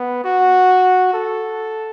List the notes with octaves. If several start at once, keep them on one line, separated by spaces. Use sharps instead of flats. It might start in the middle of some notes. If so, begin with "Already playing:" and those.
Already playing: B3
F#4
A4